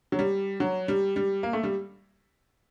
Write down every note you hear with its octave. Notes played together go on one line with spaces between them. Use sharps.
F#3
G3
F#3
G3
G3
A#3
A3
G3